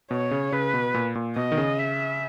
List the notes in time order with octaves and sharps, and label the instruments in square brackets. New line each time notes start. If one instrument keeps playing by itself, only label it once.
[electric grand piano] B2 [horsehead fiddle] C#5
[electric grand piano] C#3
[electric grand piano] C#3 [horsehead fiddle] B4
[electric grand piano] B2
A#2
A#2
[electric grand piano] B2 [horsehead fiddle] D#5
[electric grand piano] D#3
C#3
[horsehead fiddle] E5